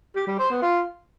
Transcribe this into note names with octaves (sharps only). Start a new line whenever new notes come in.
G4
G3
C5
B3
F4